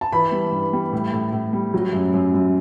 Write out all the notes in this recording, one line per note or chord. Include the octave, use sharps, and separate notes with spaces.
A5
E3 B5
G3
G2
G3
A2
A2
A2
G3
F#3
F#2
F#2
F#2